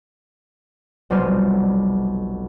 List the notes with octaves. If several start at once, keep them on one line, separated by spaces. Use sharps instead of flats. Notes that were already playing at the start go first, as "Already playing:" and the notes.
F1 B1 G3 C5 F6 D#7